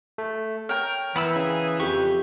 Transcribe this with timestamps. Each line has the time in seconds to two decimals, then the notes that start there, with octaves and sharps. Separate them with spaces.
0.18 A3
0.69 A#4 C#5 G5
1.16 E3 B3 B5 E6
1.36 C#3 G#4
1.80 F2 G4 C#6